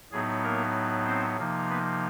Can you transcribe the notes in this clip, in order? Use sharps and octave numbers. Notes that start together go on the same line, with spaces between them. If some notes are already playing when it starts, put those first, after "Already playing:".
A2 F#3 B3 D#4 G#4
A#3 A#4
C4 C5
C3 F3 A#3 D#4
B3 B4